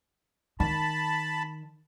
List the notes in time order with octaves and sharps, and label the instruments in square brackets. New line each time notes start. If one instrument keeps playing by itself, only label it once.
[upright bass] D#3 [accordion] A5 B5